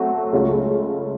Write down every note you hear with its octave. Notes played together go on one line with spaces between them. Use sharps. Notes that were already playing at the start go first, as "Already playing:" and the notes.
Already playing: F#3 A3 C4 F#4
C#2 C#3 A3 C#4 F4